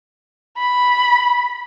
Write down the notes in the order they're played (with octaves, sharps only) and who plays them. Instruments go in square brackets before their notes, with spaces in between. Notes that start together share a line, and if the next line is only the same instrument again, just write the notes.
[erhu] B5